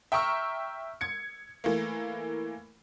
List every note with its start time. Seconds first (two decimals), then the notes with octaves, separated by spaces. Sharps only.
0.12 E5 G5 A#5 C#6 E6 F6
1.01 G#6 C#7
1.64 E3 A3 A#3